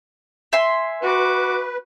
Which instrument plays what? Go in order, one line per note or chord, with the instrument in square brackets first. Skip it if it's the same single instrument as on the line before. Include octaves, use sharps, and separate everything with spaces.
[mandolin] E5 G#5 C6
[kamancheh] F#4 D6 [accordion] B4